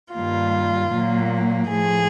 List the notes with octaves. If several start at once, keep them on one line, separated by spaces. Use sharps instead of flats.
G2 D#3 G3 A#3 F4
A#2 F#3 A#3
A2 F3 A3 G#4